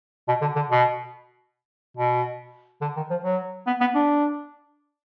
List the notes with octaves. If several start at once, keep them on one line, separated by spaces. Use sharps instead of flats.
B2
D3
D3
B2
B2
D3
D#3
F3
F#3
B3
B3
D4